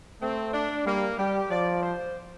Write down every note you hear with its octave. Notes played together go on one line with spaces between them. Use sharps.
A3 C4
D4
G3 A#3
G3 G4
F3 D5
C5